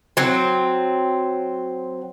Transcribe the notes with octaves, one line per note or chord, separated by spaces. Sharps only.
F#3 C4